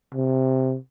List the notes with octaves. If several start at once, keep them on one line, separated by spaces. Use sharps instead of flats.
C3